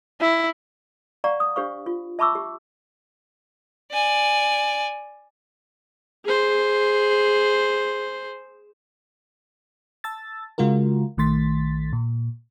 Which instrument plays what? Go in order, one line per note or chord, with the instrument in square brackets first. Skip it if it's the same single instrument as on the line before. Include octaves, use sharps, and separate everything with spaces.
[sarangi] E4
[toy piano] D5 F5 F#5 A#5 C#6
D#6
D4 G4 C5 F5 C#6
F4
E5 A5 B5 C#6 D6 E6
G4
[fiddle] D5 G#5
[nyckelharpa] G#4 C5
[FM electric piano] A5 E6 A6
C#3 G#3 F4 F#4 A#4
A#1 D#3 A3 C6 A6 B6
A#2